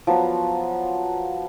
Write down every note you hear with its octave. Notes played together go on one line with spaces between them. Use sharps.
F3 F#3 B3